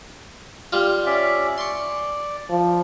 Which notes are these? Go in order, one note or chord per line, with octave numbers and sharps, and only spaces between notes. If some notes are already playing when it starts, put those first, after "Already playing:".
G3 F4
C#4 D5 E5
D5 C6 C#6
F3